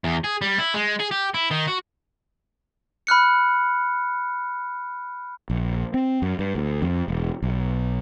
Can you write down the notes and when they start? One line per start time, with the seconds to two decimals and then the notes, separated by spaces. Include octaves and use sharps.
0.04 E2
0.24 G#4
0.42 G3
0.58 E4
0.74 G#3
1.00 G#4
1.11 G4
1.34 E4
1.51 D#3
1.67 F#4
3.07 B5 F6 F#6 C#7
5.50 A#1
5.94 C4
6.22 F#2
6.39 G2
6.55 D2
6.82 F2
7.08 E1
7.42 B1